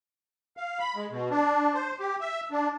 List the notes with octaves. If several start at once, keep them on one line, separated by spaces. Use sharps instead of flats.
F5
B5
G#3
B2
D4
C5
G4
E5
D4